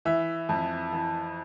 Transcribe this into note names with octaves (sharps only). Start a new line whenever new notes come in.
E3 E5
F2
E3